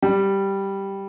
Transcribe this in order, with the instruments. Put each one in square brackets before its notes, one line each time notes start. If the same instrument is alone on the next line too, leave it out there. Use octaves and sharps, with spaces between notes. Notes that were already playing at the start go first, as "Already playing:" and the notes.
[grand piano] G3